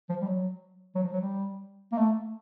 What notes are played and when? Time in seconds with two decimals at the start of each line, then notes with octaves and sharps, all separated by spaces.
0.09 F3
0.21 G3
0.27 F#3
0.95 F#3
1.04 F3
1.12 F#3
1.21 G3
1.92 A#3
1.98 A3